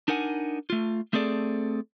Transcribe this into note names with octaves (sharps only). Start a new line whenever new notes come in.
D4 D#4 A#4 F#5 G#5
A3 F4
A3 C4 G#4 A4 D5